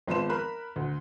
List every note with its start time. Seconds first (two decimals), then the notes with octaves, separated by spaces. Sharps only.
0.08 G#1 F3 B3 C6 E7
0.30 A#4 B5 F#6
0.76 D2